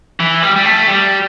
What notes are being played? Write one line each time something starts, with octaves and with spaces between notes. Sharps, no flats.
E3
G3
G3
A3
G3